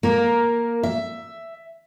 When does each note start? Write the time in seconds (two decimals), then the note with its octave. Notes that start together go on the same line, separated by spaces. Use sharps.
0.03 A#3 A#4
0.83 E5